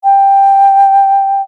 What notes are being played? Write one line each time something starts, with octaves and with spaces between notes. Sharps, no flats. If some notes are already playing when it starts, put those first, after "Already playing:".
G5